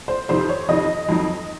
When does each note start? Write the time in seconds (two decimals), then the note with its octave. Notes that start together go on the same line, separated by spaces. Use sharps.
0.08 C5
0.29 F2 C3 D#3 C5
0.49 C#5
0.68 F2 C3 D#3 D#5
1.08 F2 D#3 F#3